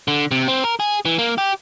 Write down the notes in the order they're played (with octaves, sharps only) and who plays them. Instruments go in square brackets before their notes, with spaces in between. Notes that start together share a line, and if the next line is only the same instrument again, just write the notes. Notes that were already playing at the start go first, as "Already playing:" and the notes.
[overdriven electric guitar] D3
C3
C4
A#4
G#4
E3
A#3
G4